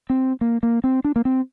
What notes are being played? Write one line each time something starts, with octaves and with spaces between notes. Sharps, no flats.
C4
A#3
A#3
C4
D4
A#3
C4